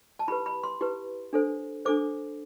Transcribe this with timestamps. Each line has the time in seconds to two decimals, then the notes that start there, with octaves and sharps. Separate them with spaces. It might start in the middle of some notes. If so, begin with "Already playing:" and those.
0.19 A5
0.28 E4 G4 B4 B5
0.46 B5
0.63 C6
0.81 E4 G4 B4
1.33 D4 A4 C5
1.85 D4 A4 C5 D6